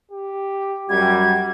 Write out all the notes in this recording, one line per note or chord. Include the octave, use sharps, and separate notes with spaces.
G4
F#2 G3 F#4 G#6